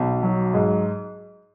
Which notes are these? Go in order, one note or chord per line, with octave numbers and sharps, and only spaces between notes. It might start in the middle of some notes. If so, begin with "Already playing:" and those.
Already playing: B1
F#3
G#2